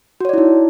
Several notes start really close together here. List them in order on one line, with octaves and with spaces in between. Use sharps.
F#4 C#5 D5 E4 D#4